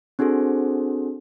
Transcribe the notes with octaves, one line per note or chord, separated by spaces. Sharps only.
C4 D4 F#4 G#4 A4 C5